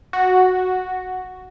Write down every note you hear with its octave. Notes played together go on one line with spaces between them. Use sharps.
F#4